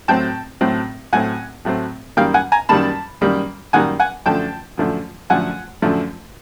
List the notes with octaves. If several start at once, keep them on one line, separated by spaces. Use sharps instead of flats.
A2 F#3 A3 C4 G5 A5
A2 F#3 A3 C4
A2 F#3 A3 C4 F#5 G#5
A2 F#3 A3 C4
F#2 D#3 G3 A#3 F5 G5
F#5 G#5
G#5 A#5
F#2 D#3 G3 A#3 A5 B5
F#2 D#3 G3 A#3
F#2 D#3 G3 A#3 F#5 G#5
F#5 G#5
F#2 D3 F3 A3 G5 A5
F#2 D3 F3 A3
F#2 D3 F3 A3 F#5 G#5
F#2 D3 F3 A3